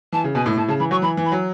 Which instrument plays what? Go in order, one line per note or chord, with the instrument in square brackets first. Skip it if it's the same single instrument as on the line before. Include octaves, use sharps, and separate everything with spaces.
[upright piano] E3 [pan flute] A5
[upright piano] C#3
[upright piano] B2 [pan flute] G#5
[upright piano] A2
[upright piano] A2 [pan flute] A5
[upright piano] C#3 [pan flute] A5
[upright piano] E3 [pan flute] B5
[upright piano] F#3 [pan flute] C#6
[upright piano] E3 [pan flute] B5
[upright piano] E3
[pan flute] B5
[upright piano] F#3